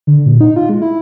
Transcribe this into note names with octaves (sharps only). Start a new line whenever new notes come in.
D3
A#2
D#4
F4
G#3
E4